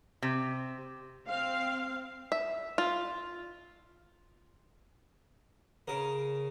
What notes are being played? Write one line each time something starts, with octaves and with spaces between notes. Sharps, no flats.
C3
C4 F5
E5
F4
C#3 A#4